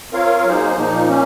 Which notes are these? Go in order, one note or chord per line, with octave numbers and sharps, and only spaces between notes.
C4 F4 A#4 C#5 F5
F#3 A#3 D#4 G#4 C5
A#2 F3 A#3 D#4
A#3 C#4